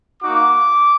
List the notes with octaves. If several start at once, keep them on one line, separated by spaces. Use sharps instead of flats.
A#3 D#4 F#4 D6